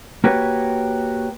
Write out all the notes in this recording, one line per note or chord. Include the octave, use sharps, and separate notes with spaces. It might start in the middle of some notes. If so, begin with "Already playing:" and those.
A#3 F#4 G4 B4 C#5